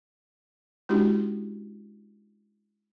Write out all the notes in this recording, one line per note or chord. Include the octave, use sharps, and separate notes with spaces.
G#3 C#4 D4 E4 F#4 G4